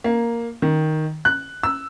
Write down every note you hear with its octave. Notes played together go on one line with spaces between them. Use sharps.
A#3
D#3
F#6
E6